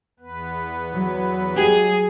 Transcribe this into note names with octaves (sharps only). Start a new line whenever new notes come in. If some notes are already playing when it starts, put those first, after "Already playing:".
E2 B3 B4
F#3
G#3 G4 G#4